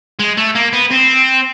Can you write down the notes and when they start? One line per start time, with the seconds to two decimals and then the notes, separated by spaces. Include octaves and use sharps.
0.20 G#3
0.37 A3
0.55 A#3
0.73 B3
0.91 C4